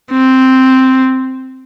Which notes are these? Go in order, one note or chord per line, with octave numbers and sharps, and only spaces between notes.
C4